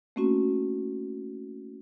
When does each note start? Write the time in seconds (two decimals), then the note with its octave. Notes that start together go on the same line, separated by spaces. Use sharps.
0.16 A3 A#3 C4 C#4 E4 F#4